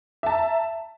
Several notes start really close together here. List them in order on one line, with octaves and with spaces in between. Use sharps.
E5 A5 A#5